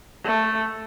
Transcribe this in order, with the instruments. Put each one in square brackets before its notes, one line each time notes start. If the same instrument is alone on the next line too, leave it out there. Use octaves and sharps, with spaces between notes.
[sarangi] A3